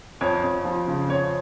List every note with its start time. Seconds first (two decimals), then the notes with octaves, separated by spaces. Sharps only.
0.21 F2 C#5
0.43 F2
0.65 F3
0.88 C#3
1.09 F2 C#5